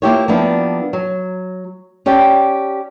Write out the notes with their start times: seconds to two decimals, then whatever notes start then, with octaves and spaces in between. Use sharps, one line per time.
0.02 A#3 E4 F4 G4 C5 C#5
0.28 F3 G3 A#3 B3 D4 E4
0.93 F#3
2.06 C#4 G4 D5 G5 A5